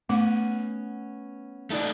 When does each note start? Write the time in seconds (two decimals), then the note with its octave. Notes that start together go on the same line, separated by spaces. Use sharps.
0.09 A3 B3 C#4 F#5 D6
1.70 A3 D#4 D5